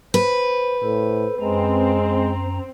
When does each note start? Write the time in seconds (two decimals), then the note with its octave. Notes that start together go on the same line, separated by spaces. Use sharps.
0.14 B4 C5
0.83 A2 A4 C5
1.41 F#2 G#3 C4 A#5